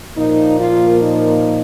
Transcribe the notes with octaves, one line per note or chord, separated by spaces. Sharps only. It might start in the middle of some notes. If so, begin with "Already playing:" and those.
A#2 F3 A#3 D#4
F4
D#4